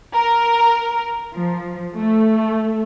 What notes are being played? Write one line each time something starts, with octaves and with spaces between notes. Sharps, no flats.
A#4
F3
A3